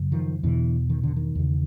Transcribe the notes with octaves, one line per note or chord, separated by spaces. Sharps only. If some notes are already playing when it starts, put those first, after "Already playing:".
Already playing: F#2 C#3
D#3 F3
E2 B2 D3 E3
D#3
D3
D#3
E2 C#3